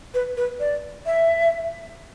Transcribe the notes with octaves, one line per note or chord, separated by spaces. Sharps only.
B4
B4
D5
E5